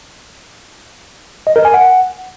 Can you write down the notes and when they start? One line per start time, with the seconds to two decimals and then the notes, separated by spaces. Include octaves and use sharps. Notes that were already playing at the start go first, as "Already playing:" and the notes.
1.47 D#5
1.56 A#4
1.65 G#5
1.74 F#5